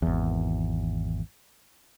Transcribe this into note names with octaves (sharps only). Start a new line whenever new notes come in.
G#1 E2